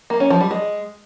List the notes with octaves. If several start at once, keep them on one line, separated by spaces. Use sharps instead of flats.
A#3
C#4
F3
G3
G#3